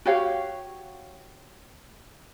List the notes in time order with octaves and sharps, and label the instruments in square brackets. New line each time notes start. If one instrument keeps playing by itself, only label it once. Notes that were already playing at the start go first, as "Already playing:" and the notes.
[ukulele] F#4 G4 C#5 F5